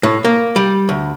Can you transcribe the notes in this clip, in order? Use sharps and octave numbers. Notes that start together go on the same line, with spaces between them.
A2
A#3
G3
D2